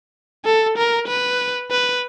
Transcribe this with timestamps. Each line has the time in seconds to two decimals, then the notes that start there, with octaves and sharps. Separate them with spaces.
0.45 A4
0.77 A#4
1.07 B4
1.71 B4